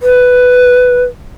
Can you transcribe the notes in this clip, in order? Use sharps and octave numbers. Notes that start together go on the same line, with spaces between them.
B4